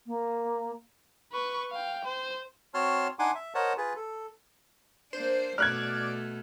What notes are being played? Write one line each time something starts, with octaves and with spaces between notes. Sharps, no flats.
A#3
B4 C#6
F5 G5
C5
C4 F#4 C#5 A5 C6 F6
D4 D#4 F#5 G#5 C6 D6
E5
A#4 C5 C#5 D#5 F#5 A5
F4 G#4 B4
A4
A#3 D4 C5
B2 A3 D5 F6 F#6 G#6